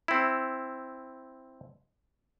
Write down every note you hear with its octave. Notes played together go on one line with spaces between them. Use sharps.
C4 E4